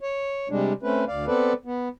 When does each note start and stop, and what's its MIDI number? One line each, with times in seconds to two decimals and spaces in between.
0.01 0.48 73
0.50 0.73 48
0.50 0.73 55
0.50 0.73 56
0.50 0.73 62
0.83 1.04 57
0.83 1.04 60
0.83 1.04 61
0.83 1.04 71
1.08 1.26 38
1.08 1.26 74
1.08 1.26 77
1.26 1.53 59
1.26 1.53 60
1.26 1.53 69
1.26 1.53 71
1.26 1.53 74
1.65 1.88 59